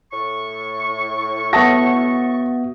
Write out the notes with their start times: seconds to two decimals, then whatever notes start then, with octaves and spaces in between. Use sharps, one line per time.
0.12 A2 C#6
1.53 B3 F#4 E5 A5 D#6 A#6